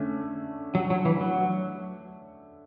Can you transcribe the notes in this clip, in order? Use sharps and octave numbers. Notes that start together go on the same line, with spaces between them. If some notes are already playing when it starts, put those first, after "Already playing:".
Already playing: D3 A3 C#4
F#3
F#3
E3
F#3